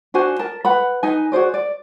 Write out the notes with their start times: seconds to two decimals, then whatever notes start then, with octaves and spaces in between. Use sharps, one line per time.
0.14 D4 F#4 C5 G#5
0.39 A#4 A5
0.65 B4 F#5 B5
1.03 D#4 B4 G#5
1.32 F#4 G#4 C5 D5
1.54 D5